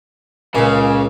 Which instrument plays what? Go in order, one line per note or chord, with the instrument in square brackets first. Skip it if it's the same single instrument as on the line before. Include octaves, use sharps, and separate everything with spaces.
[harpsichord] C#2 A#2 [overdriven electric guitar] C#3